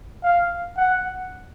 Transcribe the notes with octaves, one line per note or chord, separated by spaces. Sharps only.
F5
F#5